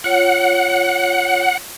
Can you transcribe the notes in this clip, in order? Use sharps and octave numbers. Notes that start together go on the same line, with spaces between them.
F4 C#5 F#5